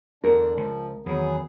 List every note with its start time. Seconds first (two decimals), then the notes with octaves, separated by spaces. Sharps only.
0.24 E2 D3 D4 A#4
0.57 C#2 F3
1.06 E2 D#3 F#3 B3 G#4